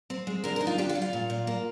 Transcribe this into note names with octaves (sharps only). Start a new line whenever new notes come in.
C4
G#3
D3 A#4
A#4
D#4
F4
D4 G4
F4
G3
F4
A#2
A#2
A#3